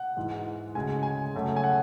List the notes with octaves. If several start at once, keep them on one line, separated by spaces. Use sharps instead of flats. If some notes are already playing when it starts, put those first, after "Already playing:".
Already playing: F#5
G#2 E3 G#3
D2 C#3 G#3 G#5
G#5
F#2 C#3 F#3 A3
G#5
F#5